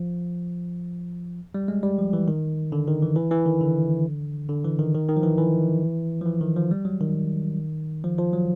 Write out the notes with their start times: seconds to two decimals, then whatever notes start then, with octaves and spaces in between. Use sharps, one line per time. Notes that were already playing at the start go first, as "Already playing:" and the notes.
Already playing: F3
1.55 G3
1.68 G#3
1.83 G3
1.98 F3
2.13 E3
2.28 D#3
2.72 D3
2.88 D#3
3.02 E3
3.16 E3
3.31 E3
3.46 D#3
3.61 D3
4.49 D3
4.65 E3
4.79 D#3
4.94 D#3
5.09 D#3
5.17 F3
5.24 E3
5.38 E3
6.21 F3
6.26 E3
6.41 D#3
6.56 F3
6.71 G3
6.85 F#3
7.01 D#3
8.04 F3
8.18 F3
8.33 F#3